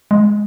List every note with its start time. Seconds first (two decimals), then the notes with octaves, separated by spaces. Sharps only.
0.11 G#3